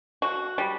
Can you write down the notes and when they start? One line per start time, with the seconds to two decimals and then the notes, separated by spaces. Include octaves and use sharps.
0.22 F#4
0.58 G3